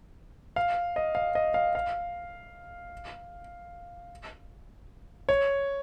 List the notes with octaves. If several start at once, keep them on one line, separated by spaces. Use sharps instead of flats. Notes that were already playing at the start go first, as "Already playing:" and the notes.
F5
D#5
F5
D#5
F5
F5
C#5